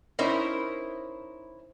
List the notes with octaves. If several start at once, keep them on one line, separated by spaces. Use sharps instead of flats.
C#4 D#4 E4 A#4 C5